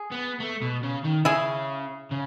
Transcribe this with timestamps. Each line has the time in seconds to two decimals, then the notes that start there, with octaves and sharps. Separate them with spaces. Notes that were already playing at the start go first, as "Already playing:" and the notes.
Already playing: G#4
0.12 B3
0.40 A3
0.62 B2
0.83 C#3
1.04 D#3
1.25 C#3 E4 G#4
2.11 C#3